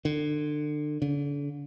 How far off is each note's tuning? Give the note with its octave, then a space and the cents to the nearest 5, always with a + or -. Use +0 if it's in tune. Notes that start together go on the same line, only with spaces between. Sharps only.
D3 +30
D3 -40